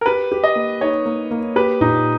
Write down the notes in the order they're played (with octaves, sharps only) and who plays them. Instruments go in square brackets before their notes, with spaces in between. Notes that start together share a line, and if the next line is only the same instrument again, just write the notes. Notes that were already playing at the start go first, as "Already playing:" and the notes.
[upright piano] A#4
[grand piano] G4 [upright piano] B4
[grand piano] G4
[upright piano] D#5
[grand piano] A#3
[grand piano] D#4 [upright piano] C#5
[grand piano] A#3
A#3
[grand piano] G4 [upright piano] B4
[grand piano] A#2 [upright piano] D#4